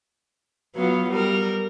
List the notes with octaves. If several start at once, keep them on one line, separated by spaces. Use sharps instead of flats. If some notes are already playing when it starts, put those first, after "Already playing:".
F#3 B3 F4
G3 A#4